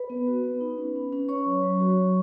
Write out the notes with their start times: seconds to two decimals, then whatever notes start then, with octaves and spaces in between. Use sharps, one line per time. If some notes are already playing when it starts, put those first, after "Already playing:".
Already playing: B4 B5
0.10 B3
0.27 F#4
0.44 B3
0.61 D#4
0.78 C#4
0.95 C#4
1.12 C#4
1.29 C#4 C#5 C#6
1.46 F#3
1.63 F#3
1.80 F#4
1.96 F#3